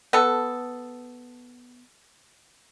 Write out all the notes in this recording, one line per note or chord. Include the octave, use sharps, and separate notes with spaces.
B3 A4